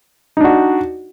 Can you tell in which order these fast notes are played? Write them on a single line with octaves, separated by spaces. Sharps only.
D#4 D4 F#4